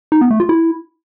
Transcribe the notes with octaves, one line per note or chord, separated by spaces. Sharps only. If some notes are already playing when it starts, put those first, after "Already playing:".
D#4
B3
A3
F4
E4